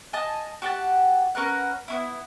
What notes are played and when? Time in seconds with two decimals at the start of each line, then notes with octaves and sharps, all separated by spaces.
0.13 D#5 G#5 A5 D#6
0.62 F#4 G4 F#5 A5
1.35 C#4 A#4 B4 F#5
1.88 B3 C#4 E4